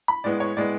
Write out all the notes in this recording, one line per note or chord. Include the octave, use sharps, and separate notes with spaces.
B5
A2 G#3 B3 D5
C#5
A2 G#3 B3 D5